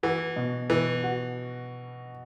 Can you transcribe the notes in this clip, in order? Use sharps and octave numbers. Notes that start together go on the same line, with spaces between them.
E3 F#4
B2
B2 E3
F#4